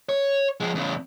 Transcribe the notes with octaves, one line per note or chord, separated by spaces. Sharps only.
C#5
F3 G#3
E2 C#3